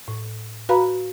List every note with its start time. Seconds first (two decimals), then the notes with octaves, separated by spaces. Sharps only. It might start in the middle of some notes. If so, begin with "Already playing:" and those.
0.08 A2
0.69 F#4 B4 F5 A#5 B5